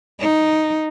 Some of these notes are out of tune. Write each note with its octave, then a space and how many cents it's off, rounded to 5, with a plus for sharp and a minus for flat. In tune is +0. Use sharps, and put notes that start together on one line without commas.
D#4 +0